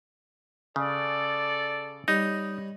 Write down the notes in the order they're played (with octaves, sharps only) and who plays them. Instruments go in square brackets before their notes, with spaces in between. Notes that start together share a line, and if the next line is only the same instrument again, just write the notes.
[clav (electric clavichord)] C#3 [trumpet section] A4 D5
[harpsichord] G3 C#5 [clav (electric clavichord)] D#4